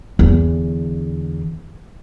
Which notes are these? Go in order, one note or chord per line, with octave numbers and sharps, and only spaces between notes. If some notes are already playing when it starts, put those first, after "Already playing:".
E2 D3